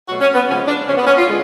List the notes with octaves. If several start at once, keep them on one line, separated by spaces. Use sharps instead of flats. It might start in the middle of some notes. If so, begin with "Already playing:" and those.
B2 F#3 A3 F#4
C#4
B3
C#3 F3 G#3 C#4
D4
C#3 F3 G#3 C#4
B3
C#4
F4
D3 G#3